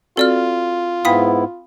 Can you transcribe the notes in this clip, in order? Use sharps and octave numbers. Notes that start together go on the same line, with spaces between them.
C4 F4 F#4 A4 D5 F6
G#2 B3 E4 F5 G5 B5 D#6 B6